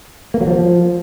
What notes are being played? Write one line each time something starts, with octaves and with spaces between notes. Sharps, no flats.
A#3
F#3
F3